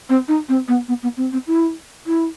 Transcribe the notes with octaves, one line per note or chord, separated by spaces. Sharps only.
C4
D#4
C4
B3
B3
B3
C4
C4
E4
E4